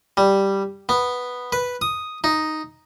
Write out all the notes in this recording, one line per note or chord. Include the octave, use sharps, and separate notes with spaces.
G3
B3
B4
D#6
D#4